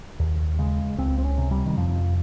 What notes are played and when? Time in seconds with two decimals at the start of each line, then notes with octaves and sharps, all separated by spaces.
0.19 D#2
0.59 C#3 G#3
0.98 C#2 C4
1.18 C4
1.24 C#4
1.38 C3
1.51 G3
1.66 D#3
1.77 F2 F3